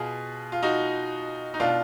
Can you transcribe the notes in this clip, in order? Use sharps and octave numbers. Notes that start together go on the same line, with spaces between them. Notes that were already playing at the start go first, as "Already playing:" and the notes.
Already playing: B2 F4 G#4
F4
D#4 F#4
D#4
B2 D4 F4